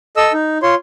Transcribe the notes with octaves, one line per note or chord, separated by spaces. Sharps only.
A4 D#5 E6
D#4
F4 C#5 C6